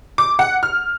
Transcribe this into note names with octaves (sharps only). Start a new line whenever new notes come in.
D6
F#5
F6